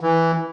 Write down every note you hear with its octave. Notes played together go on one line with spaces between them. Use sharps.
E3